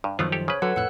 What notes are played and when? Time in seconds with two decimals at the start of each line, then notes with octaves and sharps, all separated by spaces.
0.04 G2
0.19 F#2 D#3 F3 A3 B3 F4 C5
0.32 G4 A4 C#5
0.48 C#3 B4 C#5
0.62 D3 F#3 A4 B4 F#5
0.76 F2 A2 F#5 E6 F#6